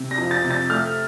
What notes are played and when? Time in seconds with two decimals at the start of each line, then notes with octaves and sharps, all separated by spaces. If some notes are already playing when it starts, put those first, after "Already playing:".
Already playing: C3
0.11 A#6
0.18 F2
0.31 A6
0.44 C3
0.51 A6
0.70 A3 F6